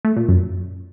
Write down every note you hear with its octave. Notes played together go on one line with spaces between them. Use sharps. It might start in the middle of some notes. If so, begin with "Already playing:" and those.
A3
A#2
F#2